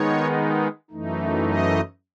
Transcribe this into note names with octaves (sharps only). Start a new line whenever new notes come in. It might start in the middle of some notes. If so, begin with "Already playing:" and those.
Already playing: D#3 G#3 B3 D#4 C#5
F#2 E3 A3 D#4
D#5